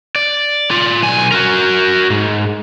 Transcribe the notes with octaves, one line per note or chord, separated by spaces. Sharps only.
D5
F4 D5
B1 G#5
F#4 A#4
G#2